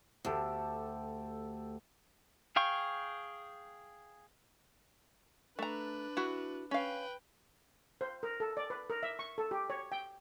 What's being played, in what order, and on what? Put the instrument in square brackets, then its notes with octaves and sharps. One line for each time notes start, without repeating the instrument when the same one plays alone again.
[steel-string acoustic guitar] D2 [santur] G4 A4
[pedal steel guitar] G#4 F5 G5 C#6
[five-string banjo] A3 A#5 [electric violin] D4 B4
[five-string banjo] E4 F#4
[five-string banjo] C#4 F5 [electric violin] B4 G5
[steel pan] C5
A#4
A4
D5
B4
A#4
E5
C#6
A4
G4
C#5
G5